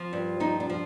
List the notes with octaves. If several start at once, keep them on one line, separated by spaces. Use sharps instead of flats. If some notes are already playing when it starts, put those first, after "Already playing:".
Already playing: F3 C4
G2
F3 D#4
D4
F3